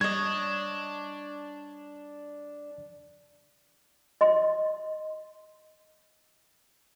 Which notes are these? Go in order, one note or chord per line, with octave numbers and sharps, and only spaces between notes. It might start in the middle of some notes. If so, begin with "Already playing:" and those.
G3 D4 C#5 D#5 G#6
D#5 C6